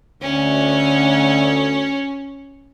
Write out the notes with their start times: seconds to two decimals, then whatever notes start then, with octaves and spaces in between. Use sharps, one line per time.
0.22 D2 C#4